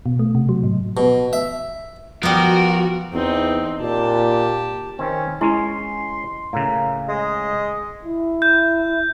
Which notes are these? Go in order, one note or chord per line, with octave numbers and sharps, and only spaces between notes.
B2
A3
C3
F#3
A2
B2
E5
F3 G3 B3 F#4 A#4
E2 C4 D#4
A#2 G4 A5
D#3 C4 C#4
G#3 C#4 E4 C#5 C6
A2 C#3 A#3
G#3 D#5
E4
G6